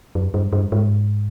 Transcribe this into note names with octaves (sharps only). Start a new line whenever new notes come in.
F#2
G2
G2
G#2